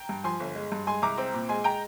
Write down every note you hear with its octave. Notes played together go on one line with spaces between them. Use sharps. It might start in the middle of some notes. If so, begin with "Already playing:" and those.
Already playing: G5 A#5
G2
F3 G#5 C6
G1
G#3
G2
G#3 G#5 C6
C2 A#5 D6
C4
A#2
G#3 G#5 C6
G5 A#5